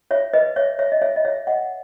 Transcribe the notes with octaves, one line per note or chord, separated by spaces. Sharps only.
C#5 E5
B4 D#5
C#5 E5
C#5 E5
D#5
C#5 E5
D#5
C#5 E5
D#5 F#5